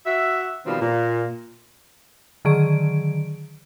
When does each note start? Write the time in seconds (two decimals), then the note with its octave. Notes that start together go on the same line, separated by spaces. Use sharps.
0.06 F#4 E5
0.66 B2 D#3 F3 G3 B3 C4
0.81 A#2
2.45 D3 D#3 F#3 G#4 D7